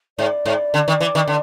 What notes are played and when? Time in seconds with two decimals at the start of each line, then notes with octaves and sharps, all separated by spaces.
0.19 G#2 D5
0.46 G#2
0.74 D3
0.88 D#3
1.01 E3
1.15 D#3
1.28 D3